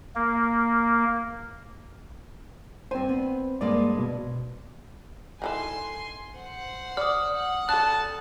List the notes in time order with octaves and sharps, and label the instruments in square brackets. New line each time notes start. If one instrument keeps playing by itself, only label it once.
[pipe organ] A#3
[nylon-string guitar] G2 G#5 [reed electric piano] C4 C5
[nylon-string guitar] B3
[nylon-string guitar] G2 G#3 A#3 [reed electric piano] D5
[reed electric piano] B2
[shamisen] D#3 E3 A4 [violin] G#5 C6
[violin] C5 F#5
[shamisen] D5 [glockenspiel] D#6 F6
[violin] F#5
[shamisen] D4 A4 [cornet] A5 [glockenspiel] F#6